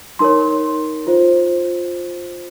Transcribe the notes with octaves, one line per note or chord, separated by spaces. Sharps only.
D#4 A#4 C#5 C6
F4 C5